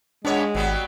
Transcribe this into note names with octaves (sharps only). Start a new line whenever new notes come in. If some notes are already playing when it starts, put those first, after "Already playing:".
A#2 G#3 B3 D4 C#5
G#1 F#3 G3 B3